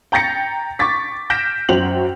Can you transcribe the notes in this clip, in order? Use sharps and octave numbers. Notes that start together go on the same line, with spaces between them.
G5 A#5 G6 A6 A#6 C#7
C#6 D6 A6 B6
F6 G6 A#6 B6 D7 E7
F#2 F#4 C5 G5 F7 F#7